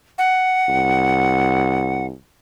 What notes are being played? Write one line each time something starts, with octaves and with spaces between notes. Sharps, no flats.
F#5
C2